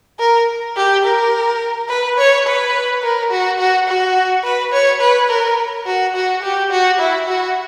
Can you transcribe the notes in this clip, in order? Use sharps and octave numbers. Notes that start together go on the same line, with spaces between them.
A#4
G4
A#4
B4
C#5
B4
A#4
F#4
F#4
F#4
B4
C#5
B4
A#4
F#4
F#4
G4
F#4
E4
F#4